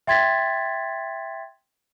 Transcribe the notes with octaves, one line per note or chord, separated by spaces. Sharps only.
E5 G5 C6 G#6 A6 B6